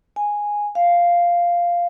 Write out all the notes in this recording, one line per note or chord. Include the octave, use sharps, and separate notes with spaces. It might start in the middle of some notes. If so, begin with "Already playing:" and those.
G#5
F5